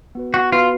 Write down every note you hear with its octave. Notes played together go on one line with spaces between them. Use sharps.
B3 F#4 B4
F#4
B3 F4 F#4 B4